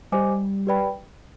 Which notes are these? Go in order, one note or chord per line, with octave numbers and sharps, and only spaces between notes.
G3 G4 C5 D#5 G#5 D6
G4 B4 D5 G5 B5